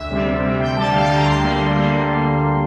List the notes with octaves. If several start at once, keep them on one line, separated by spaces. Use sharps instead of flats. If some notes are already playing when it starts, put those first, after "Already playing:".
Already playing: D2 E5
C3 G3 C4
D2
C3 G3 C4
D2 G5
D3 G3 A5
D2 F5
G5
D3 G3 A5
A#5
D2 C6
D3 G3 A#3
D2
D3 G3 A#3